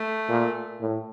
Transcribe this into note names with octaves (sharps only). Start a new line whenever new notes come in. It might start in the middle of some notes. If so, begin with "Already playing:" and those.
Already playing: A3
A#2
A2